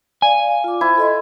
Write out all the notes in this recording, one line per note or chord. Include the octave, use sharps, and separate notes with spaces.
D5 F5 G#5
F4 D6
E4 C5
A4 D#5 C6